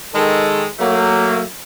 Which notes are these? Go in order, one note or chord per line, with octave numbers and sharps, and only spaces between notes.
D#3 G#3 A4
F#3 A3 A#3